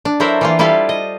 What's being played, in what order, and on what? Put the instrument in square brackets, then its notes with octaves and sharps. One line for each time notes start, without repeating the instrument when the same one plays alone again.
[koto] D4
F#3 E4 A4 A#4 C5 E5
E3 A#3 F4
G3 E4 F4 G4 A4 F5
D#5